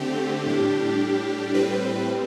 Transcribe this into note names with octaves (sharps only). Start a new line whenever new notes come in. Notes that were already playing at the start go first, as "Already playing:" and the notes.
Already playing: D3 A3 C4 G4
A2 G3 D4
A2 G3 C4 B4